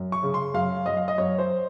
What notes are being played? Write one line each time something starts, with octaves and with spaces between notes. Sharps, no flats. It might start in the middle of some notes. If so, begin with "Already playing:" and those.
Already playing: F#2
C#6
C#3
C6
F#2 F5
F#2 D#5
F5
D#5
F#2 C#5
C5